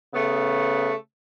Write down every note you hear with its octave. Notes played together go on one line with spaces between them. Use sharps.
C#3 A3 B3